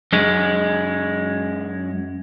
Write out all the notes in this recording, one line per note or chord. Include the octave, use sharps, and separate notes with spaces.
F#2 G#3